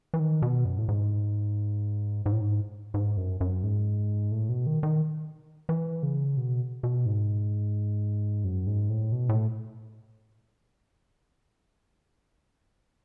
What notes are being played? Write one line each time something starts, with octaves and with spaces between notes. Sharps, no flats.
E3
D#3
B2
F#2
A2
G#2
G#2
A2
G#2
G#2
F#2
F#2
G#2
A2
B2
D#3
D#3
E3
C#3
B2
B2
G#2
F#2
G#2
A2
B2
A2